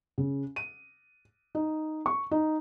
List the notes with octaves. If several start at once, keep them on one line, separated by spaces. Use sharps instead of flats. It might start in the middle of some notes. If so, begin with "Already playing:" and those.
C#3
D#7
D#4
C#6
D#4